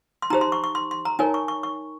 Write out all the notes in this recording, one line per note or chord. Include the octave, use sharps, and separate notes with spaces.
C6
D#4 G4 C5 A#5
C6
C#6
C#6
C6
C6
A#5
D#4 A#4 C#5 G#5
C#6
C#6
C#6